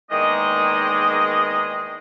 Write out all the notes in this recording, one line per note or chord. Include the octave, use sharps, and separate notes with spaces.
E2 D#3 G#3 A#3 D#4 D#5